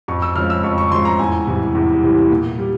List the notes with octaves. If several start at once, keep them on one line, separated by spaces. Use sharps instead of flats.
F2 C#6
E6
C#3 F3 G#3 F6
E6
F2 C#6
C#6
C#3 F3 G#3 C6
A#5
E2 G#5
C3 E3 G3
E2
C3 E3 G3
A#2
G3